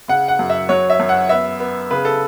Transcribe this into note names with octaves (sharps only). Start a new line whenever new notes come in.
C#3 F#5
F#5
F#2
E5
F#3 C#5
E5
F#2
F#5
B3 E5
B3
C#3 B4
A4